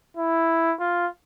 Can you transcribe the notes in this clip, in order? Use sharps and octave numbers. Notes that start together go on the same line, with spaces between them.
E4
F4